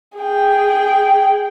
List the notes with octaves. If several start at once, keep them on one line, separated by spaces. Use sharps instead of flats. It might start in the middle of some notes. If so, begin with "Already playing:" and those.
G#4 G5